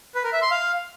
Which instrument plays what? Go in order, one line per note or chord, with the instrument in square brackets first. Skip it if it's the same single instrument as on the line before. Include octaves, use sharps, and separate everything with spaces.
[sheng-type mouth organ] B4
A#4
E5
C6
F5